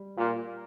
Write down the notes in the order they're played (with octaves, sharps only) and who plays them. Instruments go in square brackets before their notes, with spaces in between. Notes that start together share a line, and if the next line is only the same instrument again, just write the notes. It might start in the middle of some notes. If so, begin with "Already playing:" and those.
Already playing: [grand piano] G3
[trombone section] A#2